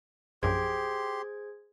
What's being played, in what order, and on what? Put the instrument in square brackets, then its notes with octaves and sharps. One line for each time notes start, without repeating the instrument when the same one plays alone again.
[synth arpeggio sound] A#1 F#2 [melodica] G4 C6 [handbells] G#4 C5 G#6